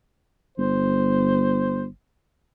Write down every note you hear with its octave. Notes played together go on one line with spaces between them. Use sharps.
G1 C5